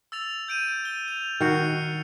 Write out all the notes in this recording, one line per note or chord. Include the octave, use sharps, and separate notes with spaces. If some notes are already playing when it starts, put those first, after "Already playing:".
E6 A6 F7
G6 D7 D#7
G7
F7
D#3 F#4 F6 C7 C#7